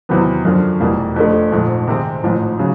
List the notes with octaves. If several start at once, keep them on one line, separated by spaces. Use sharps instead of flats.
E2 C3 D#3 F#3 B3
F#2 D3 F3
F1 E2 B2 G3 A#3
F2 D3 F3 A3
A#1 G#2 F3
C3 D#3 G#3 C4
A1 G#2 F3
C#3 F#3